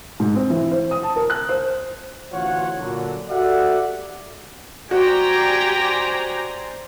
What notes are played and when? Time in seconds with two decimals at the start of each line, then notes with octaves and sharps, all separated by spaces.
0.20 G#2
0.35 C4
0.50 E3
0.72 C5
0.91 D#6
1.03 A5
1.16 A#4
1.30 F#6
1.49 C5
2.33 A1 D2 E3 F4 C#5 F#5
2.80 A#2 D3 F#3
3.30 F#4 G4 A4 D5 E5 F#5
4.91 F#4 G4 C5 D5 G5 G#5 A#5